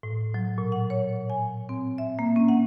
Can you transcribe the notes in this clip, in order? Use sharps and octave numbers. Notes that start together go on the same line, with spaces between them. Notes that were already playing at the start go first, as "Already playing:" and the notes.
A2
F#3
A#2
F#5
C#5
G#5
C4
E5
A#3
C#4
F#5